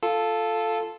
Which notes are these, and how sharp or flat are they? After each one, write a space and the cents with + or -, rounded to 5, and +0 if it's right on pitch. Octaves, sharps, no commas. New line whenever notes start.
F4 +0 A4 +0